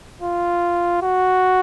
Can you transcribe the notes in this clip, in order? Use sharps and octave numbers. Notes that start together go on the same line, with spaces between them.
F4
F#4